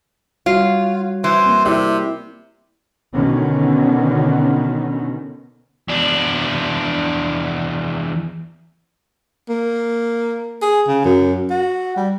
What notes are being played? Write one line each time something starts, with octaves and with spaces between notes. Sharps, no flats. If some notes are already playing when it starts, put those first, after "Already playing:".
G3 F4 F#4 C#5
E3 C5
A#3 C4
C3 E4 G4 D5
B2 D3 D#3 B3 C#4
E2 D4
A#3
G#4
C#3
F#2
F#4
G3